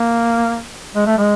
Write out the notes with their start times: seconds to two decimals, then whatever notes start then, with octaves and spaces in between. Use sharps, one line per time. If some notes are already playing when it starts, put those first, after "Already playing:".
Already playing: A#3
0.96 G#3
1.06 A3
1.18 G#3